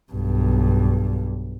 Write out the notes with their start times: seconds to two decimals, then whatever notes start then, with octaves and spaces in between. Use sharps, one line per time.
0.12 B1 G2